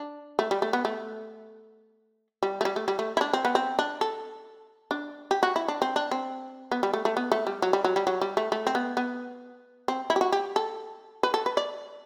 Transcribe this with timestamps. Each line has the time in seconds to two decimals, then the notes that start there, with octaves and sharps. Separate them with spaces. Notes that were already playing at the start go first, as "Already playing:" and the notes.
Already playing: D4
0.39 A3
0.51 G3
0.62 A3
0.73 B3
0.85 A3
2.43 G3
2.61 A3
2.65 G3
2.76 A3
2.88 G3
2.99 A3
3.17 E4
3.21 D4
3.33 C4
3.45 B3
3.55 C4
3.79 D4
4.01 A4
4.91 D4
5.31 G4
5.43 F#4
5.56 E4
5.68 D4
5.82 C4
5.96 D4
6.11 C4
6.71 B3
6.83 G3
6.94 A3
7.05 A3
7.17 B3
7.32 A3
7.47 G3
7.62 F#3
7.73 G3
7.84 F#3
7.96 G3
8.07 F#3
8.21 G3
8.37 A3
8.52 A3
8.67 C4
8.75 B3
8.97 B3
9.88 C4
10.10 E4
10.16 G4
10.21 F#4
10.32 G4
10.56 A4
11.23 B4
11.34 A4
11.46 B4
11.57 D5